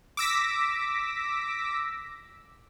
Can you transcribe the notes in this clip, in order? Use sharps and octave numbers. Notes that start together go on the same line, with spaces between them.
D6 E6 A#6 B6